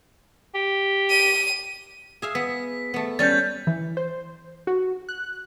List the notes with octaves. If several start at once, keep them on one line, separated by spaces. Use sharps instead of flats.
G4
D#7
G#4 E5 F5
B3 B6
A3 B3
G3 C#4 C#5 G6 A6
E3
C5
F#4
F#6